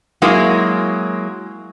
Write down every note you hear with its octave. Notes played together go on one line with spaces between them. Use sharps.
F#3 G#3 A#3 E4